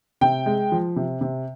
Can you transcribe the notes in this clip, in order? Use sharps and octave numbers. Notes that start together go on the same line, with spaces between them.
C3 G5
G#3
F3
C3
C3